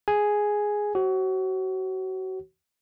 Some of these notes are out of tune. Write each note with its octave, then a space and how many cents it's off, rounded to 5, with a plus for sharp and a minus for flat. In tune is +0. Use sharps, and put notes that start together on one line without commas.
G#4 +0 G#5 +0
F#4 +30 C5 +45